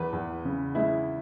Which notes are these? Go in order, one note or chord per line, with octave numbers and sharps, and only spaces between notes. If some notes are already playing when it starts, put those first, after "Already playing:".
Already playing: E2 B4
E2
C#3
G#3 E4